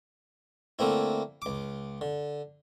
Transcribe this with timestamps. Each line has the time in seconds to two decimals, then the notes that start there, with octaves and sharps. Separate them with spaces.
0.79 D3 A3 A#3 C4 E4
1.42 C#2 D6
2.01 D3